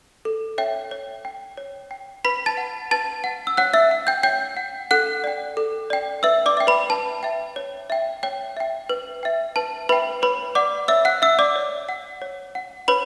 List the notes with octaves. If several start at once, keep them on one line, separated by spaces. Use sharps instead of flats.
A4
C#5 E5 G5
C#5
G5
C#5
G5
B4 B5 B6
A5 A6
F#5
B4 A5 A6
F#5
E6
C#5 F#5 F#6
E5 E6
F#5
G5 G6
C#5 G5 G6
F#5
A4 F#5 F#6
D5 G5
A4
D5 G5
B4 E5 E6
D5 D6
E5 G5
B4 B5
B4 A5
E5 G5
C#5
E5 G5
C#5 G5
E5 G5
B4
E5 G5
B4 A5
B4 E5 G5 B5
B4 C#5 B5
D5 F#5 D6
C#5 E5 E6
F#5 F#6
E5 F#5 E6
D5 D6
C#5
F#5
C#5
F#5
B4 C#5 B5